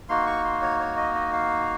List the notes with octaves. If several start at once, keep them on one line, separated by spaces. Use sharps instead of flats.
A#3 D#4 F#4 C6
C#6
C6
C#5
C#5
D#5
D#5
F5